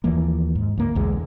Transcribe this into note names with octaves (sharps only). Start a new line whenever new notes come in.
D#2 E3 F3 A#3
G#2
D2 A#3
B1 E2 D3 G#3